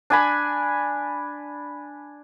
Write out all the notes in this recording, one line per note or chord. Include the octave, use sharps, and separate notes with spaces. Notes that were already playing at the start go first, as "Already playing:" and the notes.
D4 G#5 B5